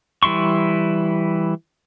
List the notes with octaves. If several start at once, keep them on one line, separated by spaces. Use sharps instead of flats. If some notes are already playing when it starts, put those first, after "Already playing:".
E3 G3 E4 C6 C#6